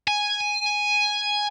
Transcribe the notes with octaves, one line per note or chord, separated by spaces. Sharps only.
G#5